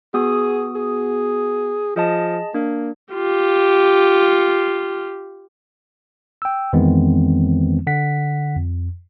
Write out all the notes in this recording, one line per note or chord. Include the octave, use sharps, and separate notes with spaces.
B3 F#4 G#4 D#6
G#4
F3 G#4 D#5 A5
A#3 D4
F4 G4
G5 E6
F2 D#3 E3 G#3 B3 C4
D3 F#5 B6
F2